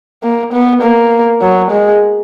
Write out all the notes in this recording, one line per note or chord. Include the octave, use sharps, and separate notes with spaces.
A#3
B3
A#3
F#3
G#3